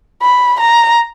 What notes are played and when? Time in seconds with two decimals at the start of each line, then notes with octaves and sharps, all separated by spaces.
0.22 B5
0.60 A#5